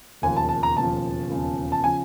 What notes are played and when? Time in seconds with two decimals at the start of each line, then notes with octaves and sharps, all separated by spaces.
0.22 E1 D#2 C#3 F3 G#5
0.37 A5
0.49 A5
0.63 A#5
0.77 E1 D#2 C#3 F3 A5
1.30 E1 D#2 C#3 F3
1.72 A5
1.84 C#3 F3 G#5